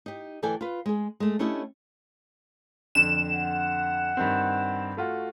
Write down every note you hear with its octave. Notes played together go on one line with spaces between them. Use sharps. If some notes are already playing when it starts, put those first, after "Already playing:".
D#4 G4
D2 E3 A4 D5 G5 G#5
F4 B4
G#3 G#4
G#3 A3
A3 C#4 D4 E4 G4 D#5
F2 D3 E7
F#5
G2 D#3 C4
A3 F4 F#4